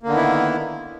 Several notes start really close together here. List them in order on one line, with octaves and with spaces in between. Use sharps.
A#3 D3 D#3 B3 E4